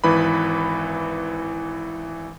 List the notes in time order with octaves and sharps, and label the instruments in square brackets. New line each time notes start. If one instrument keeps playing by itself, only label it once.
[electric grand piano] G#1 E3 B4 B5